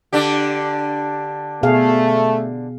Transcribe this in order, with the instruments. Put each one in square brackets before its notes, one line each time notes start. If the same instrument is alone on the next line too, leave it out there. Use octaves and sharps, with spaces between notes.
[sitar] D3 D4 G4
[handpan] B2 G#4 F5 [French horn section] A3